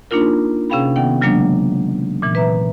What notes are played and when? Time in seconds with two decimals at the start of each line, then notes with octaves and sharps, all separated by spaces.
0.11 A#3 D4 D#4 F4 A#4
0.70 C3 C#4 G#4 F5 G5 B5
0.96 D#3 B3 F#5 G5
1.21 C#3 F#3 G#3 A#3 D4
2.22 A#2 E3
2.35 B4 E5 A#5